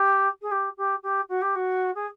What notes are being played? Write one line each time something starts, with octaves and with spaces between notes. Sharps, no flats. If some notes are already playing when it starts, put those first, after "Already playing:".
Already playing: G4
G#4
G4
G4
G4
F#4
G4
F#4
G#4